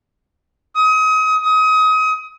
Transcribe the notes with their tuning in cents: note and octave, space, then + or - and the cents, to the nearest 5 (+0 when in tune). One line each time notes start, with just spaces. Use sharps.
D#6 +30
D#6 +30